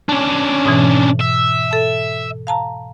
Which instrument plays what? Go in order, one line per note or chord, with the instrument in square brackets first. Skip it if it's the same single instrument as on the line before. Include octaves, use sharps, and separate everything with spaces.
[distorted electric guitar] C#4 D4
[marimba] G#2 B2 E3
[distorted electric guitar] E5
[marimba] A4 A5
F5 A5 A#5